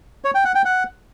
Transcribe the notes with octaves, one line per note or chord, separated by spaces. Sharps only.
C#5
G5
F#5
G5
F#5